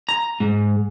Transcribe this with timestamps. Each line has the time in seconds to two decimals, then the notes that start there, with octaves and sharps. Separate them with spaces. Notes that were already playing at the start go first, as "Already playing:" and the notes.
0.09 A#5
0.40 G#2